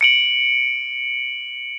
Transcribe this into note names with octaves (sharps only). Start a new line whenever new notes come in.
C#7 D7 F#7